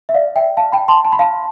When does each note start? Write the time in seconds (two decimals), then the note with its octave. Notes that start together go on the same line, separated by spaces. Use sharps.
0.09 E5
0.14 D5 F5
0.36 E5 G5
0.57 F5 A5
0.72 G5 B5
0.88 A5 C6
1.05 A5
1.12 B5
1.19 F5 A5